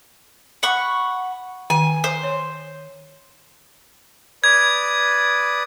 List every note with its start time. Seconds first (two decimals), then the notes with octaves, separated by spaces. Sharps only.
0.63 F#5 B5 C#6
1.70 D#3 G#5
2.04 C5
2.23 C#5
4.44 B4 D5 D#6 G#6